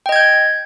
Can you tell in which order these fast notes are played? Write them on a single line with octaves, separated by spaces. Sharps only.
G5 D#5 G#6 G6